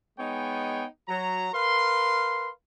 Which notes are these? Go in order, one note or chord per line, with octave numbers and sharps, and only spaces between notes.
G#3 B3 D#4 C#5 G5 G#5
F#3 A#5
A#4 B4 F5 C6